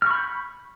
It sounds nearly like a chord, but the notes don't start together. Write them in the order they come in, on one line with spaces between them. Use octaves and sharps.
F6 C#6 B5 G6